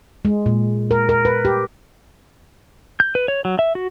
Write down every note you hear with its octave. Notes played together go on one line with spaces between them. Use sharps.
G#3
A#2
A#4
A#4
B4
G4
G6
B4
C#5
F#3
E5
F#4